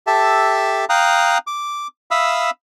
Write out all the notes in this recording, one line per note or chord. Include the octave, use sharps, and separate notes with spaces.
G4 A4 E5 A5
F5 G5 A#5 D#6 F#6
D6
E5 F5 B5 D#6 E6